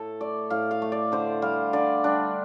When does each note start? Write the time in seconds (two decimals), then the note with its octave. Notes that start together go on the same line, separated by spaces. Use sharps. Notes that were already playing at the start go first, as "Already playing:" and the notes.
Already playing: A2 A4
0.21 A3 D5
0.50 A2 F5
0.71 F5
0.82 A3
0.92 D5
1.12 D3 C5
1.42 G3 F5
1.73 D3 D5
2.04 G3 D4